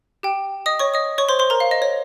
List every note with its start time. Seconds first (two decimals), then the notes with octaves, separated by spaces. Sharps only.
0.23 G4 G5
0.66 D#5 D#6
0.79 C#5 C#6
0.94 D#5 D#6
1.18 C#5 C#6
1.29 C5 C6
1.39 C5 C6
1.50 A#4 A#5
1.60 F5
1.71 D#5
1.82 C#5